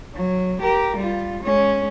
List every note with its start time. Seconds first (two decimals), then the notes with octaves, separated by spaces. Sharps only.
0.15 F#3
0.61 G4 A#4
0.96 G3 F4
1.42 G#3 C#4